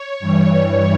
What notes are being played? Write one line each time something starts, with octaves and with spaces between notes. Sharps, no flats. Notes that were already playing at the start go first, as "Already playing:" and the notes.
Already playing: C#5
G2 E3 G3